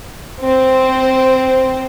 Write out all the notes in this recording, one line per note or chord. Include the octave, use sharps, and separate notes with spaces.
C4 C5